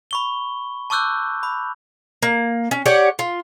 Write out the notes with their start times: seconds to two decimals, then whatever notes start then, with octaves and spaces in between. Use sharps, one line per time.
0.11 B5 C#6 G7
0.90 A5 C#6 D6 E6 F#6 G6
1.43 B5
2.23 A#3
2.71 C#4
2.86 G4 C#5 D5 F#5
3.19 F4